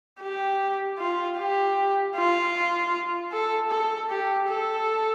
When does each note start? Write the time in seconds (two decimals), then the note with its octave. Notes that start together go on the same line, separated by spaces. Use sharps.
0.21 G4
0.99 F4
1.38 G4
2.15 F4
3.32 A4
3.70 A4
4.10 G4
4.48 A4